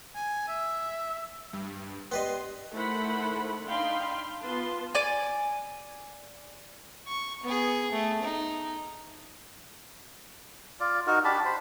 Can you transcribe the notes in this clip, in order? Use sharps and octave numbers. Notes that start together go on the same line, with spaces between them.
G#5
E5
G2
B3 G4 B4 D5 D#5 G5 C6
D#3 A3 E4 C5 F#5 B5
D4 D#4 F5 G5 B5 C6
B3 F4 B4 A5 C6
D5 G#5
C#6
B3 G#4
A3
D#4
F4 D5
D#4 F#4 A#4
D4 G4 A5 B5
C5 B5